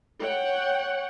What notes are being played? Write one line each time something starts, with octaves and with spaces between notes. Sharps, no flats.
C#5 F#5 G5